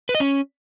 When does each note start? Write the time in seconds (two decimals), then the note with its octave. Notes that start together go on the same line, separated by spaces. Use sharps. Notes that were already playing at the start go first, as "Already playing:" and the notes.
0.09 B4
0.15 D#5
0.20 C#4